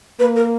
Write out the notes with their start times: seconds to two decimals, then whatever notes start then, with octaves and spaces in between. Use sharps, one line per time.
0.19 A#3 B4
0.36 A#4